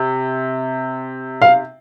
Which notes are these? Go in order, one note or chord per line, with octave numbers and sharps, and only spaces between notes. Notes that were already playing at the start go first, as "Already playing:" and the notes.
Already playing: C3
F5